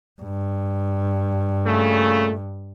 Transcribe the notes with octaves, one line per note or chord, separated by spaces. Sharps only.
G2
A#2 C#3 A3